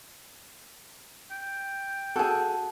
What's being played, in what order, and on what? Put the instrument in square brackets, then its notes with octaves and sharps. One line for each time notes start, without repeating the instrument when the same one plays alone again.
[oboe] G5
[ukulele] F#4 A5 [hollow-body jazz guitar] G#4 A4